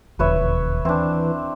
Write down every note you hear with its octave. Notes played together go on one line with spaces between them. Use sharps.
E1 D#2 D3 F3 B4 C#5 E5
E3 C4 D4